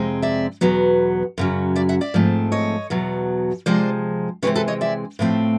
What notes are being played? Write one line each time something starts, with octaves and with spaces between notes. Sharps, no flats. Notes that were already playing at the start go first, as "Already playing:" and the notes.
Already playing: F2 C3 G#3 C4
D5 E5
E2 B2 F#3 B3
F#2 C#3 F#3
D5 E5
E5 F#5
D5 E5
G#2 F3 A3 C4
C#5 D#5
E2 B2 F#3
C3 F3 G#3 C5 D5
C3 E3 G#3 C4 B4 C#5
A4 B4
C#5 D#5
D5 E5
A2 F3 A3 C4